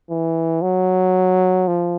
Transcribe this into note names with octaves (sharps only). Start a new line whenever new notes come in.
E3
F#3
F3